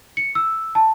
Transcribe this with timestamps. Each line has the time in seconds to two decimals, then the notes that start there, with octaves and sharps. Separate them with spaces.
0.17 C#7
0.35 E6
0.75 A5